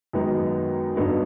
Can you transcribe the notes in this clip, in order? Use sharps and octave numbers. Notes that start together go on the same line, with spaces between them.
F#2 D#3 G#3 B3 D#4
G2 D3 F#3 B3 D#4